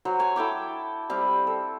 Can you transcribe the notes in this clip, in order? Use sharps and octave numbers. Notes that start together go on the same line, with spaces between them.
F#3 C5
C#5 G#5
E4 A4 G5 D6
G3 C4
A4